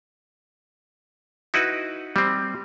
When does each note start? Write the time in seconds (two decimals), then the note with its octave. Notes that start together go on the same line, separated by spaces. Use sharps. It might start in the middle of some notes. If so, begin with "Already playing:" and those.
1.54 D#4 E4 F#4 B4
2.16 G3 C4